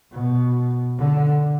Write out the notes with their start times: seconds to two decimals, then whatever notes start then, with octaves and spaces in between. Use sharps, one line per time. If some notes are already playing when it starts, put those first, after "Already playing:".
0.12 B2
0.98 D3